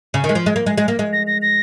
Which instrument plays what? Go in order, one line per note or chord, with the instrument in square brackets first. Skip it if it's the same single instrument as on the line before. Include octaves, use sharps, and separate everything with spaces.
[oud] C#3
D#3
G#3
F3
G#3
A#3
G#3
G#3
A#3
G#3
[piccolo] A#6
A#6
A#6